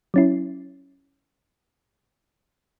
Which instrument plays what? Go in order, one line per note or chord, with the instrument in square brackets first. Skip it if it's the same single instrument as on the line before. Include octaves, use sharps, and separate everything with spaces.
[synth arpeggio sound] F#3 C#4 E4